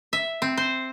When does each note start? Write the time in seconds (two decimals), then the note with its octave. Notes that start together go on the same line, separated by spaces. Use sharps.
0.13 E5
0.42 C4
0.57 C5